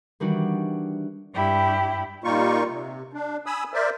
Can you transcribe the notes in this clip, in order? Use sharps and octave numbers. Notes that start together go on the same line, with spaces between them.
D#3 E3 G3 D4 F#4
G2 E4 G4
A#2 G3 A#3 D#4 F4 C#6
C3
D4
G#5 B5 D#6 E6
A#4 C5 D5 E5